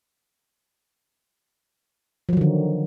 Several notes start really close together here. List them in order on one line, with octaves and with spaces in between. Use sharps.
F3 F#3 D#3 D3